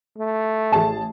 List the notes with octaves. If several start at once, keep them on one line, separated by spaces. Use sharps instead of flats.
A3
A1 G#4 A5